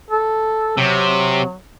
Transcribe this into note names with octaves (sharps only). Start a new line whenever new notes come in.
A4
C3 F#3